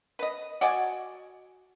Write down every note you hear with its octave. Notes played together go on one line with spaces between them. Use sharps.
B4 D#5
F#4 D5 D#5 G#5